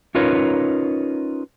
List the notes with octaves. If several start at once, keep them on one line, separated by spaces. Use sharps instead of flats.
C#4 D#4 F4 A#4 B4 C#5